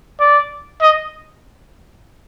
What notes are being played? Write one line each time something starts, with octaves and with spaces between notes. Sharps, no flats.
D5
D#5